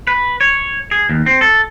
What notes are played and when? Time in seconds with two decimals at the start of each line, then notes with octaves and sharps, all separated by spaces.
0.07 B4
0.41 C#5
0.91 G#4
1.09 D#2
1.26 C4
1.41 A4